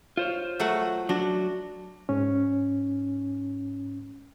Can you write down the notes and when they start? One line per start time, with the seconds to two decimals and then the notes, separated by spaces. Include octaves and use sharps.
0.17 F4 C5 C#5
0.60 F#3 A3 F#5
1.09 F#3 D4 F#4
2.09 G#2 C#4